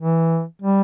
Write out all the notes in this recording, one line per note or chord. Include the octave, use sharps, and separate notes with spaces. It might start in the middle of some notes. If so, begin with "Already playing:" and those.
E3
G3